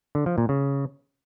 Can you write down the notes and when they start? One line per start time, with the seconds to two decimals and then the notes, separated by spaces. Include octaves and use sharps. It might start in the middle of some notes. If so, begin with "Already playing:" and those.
0.15 D3
0.26 F3
0.38 A#2
0.49 C#3